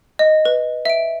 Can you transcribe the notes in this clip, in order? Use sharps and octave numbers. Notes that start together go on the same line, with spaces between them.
D#5
B4
E5 D7